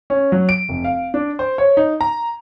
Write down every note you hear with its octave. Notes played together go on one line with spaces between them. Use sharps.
C#4
F#3
D7
F1
F5
D4
C5
C#5
D#4
A#5